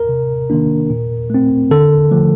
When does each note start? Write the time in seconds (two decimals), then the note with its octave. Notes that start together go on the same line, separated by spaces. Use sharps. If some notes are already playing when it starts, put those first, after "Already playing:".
Already playing: A#4
0.09 C3
0.50 D#3 A#3 D4
0.90 A#2
1.30 A3 C4
1.71 D3 A4
2.11 F3 A3